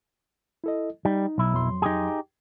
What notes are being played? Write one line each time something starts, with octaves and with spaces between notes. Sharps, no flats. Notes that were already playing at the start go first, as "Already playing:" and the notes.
E4 A4 D#5
G3 D#4
B1 E4
F2 F#3 C6
D#4 G4 G#4